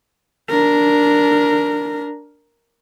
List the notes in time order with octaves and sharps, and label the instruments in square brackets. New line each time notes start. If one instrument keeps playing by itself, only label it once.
[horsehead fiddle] D4 A#4